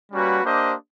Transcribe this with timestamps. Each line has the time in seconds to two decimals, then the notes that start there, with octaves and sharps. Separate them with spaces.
0.12 G3 A#3 C#4 F#4 B4
0.44 A#3 D4 G4 C5 D#5